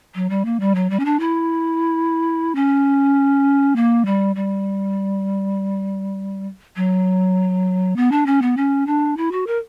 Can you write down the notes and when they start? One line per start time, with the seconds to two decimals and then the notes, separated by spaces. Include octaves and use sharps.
0.15 F#3
0.30 G3
0.45 A#3
0.60 G3
0.75 F#3
0.90 G3
1.00 C#4
1.05 D4
1.20 E4
2.55 C#4
3.76 A#3
4.06 G3
4.36 G3
6.76 F#3
7.96 B3
8.12 D4
8.26 C#4
8.42 B3
8.57 C#4
8.87 D4
9.17 E4
9.32 F#4
9.47 A#4